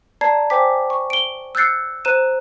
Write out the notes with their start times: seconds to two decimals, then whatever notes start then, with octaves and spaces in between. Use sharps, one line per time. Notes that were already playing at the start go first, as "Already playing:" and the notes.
0.21 D5 A5 A#5 G#6 C7
0.50 C5 G5 G#5 D6 B6
0.90 C#6
1.10 D7 G7
1.55 E6 F#6 G6 A6 C7 C#7
2.05 C5 A#5 F#6 D#7 E7